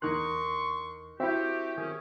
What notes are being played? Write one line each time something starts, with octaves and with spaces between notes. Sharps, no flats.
E2 D#4 A#4 C6 C#6 F#6
C4 E4 F#4 G4 E5
D#3 C#4 G#4